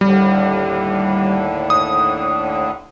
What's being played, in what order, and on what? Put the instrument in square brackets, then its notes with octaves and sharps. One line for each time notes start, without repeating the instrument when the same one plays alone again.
[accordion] D#2 A2 D3 [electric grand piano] G3
[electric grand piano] D#6